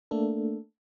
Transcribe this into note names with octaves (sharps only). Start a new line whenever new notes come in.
A3 A#3 D4 A4